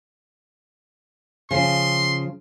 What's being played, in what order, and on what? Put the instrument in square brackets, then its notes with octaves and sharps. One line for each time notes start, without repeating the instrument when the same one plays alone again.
[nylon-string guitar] C#3 F3 [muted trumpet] C6